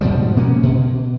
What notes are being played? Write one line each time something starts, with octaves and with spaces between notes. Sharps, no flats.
G#2 B2 F3 G3
B2 A#3 B3 C#4
B2